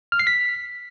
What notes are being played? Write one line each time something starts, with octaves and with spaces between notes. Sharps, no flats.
F6
C7
B6